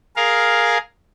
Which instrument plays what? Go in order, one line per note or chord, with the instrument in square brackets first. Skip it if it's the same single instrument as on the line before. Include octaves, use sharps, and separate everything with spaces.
[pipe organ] G#4 A#4 F5